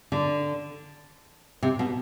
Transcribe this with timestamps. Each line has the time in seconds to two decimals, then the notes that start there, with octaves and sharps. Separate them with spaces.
0.12 D3
1.63 C3
1.79 B2